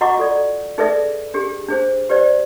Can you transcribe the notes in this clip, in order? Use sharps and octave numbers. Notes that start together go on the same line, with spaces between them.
F#4 D#5 F#5 A#5 C#6 D6
F4 A4 D5
D#4 G#4 A4 B4 D5 E5
D4 G4 G#4
D4 G#4 C5
G4 B4 C5 D5